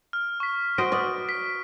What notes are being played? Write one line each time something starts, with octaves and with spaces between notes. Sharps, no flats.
F6
C#6 B6
F#4 C5 D#5 F6 D7
B4 D5 D#5
B6